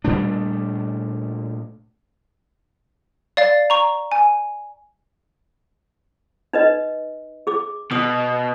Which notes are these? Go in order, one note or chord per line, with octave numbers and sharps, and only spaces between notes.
A#2 G3 A3 D4
D5 F5 A6
A#5 C#6
G#5
D#4 B4 D#5
G#4 D6
B2 D#6